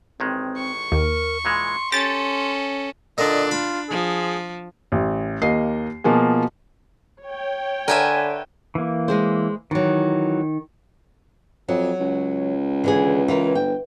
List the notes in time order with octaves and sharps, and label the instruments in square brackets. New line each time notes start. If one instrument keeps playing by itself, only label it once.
[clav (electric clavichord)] A1 D#3 G#3 [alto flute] C4
[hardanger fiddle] C#6
[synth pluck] D#2 [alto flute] A#4
[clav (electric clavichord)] A#2 E3 G#3 [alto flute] C6
[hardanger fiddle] C#4 A4 [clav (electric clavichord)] G4 [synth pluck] A6 A#6
[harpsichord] A#2 D3 A#3 [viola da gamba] D4 [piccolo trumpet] D#5
[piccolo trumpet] F4 [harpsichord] B5
[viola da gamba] F3 [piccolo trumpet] G#4
[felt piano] A1
D#2 A#3 D#5 C7
B2 F3 A#3 F4 G#4
[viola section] C#5 G5
[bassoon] D3 [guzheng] A#4 B4 E5 [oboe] G#5
[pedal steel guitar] E3 A#3
[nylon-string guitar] G#3 G#4 C5
[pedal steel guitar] D#3 [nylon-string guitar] E3 F#3
[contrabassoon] F2 [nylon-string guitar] F#3
[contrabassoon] C#2
[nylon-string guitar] D3 E3 G#4
E3 F4 A#4
[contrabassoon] G1 [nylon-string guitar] G5